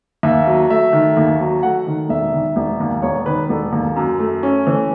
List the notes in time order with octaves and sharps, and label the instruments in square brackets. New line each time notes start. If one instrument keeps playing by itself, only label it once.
[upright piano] D#2 E5
F#3
A3 E5
D#3
D#2
F#3
A3 F#5
D#3
E1 E5
D#3
E1
D#2
E1 C#5
D#3 B4
E1 A4
D#2
F#2
A3
C#4
E3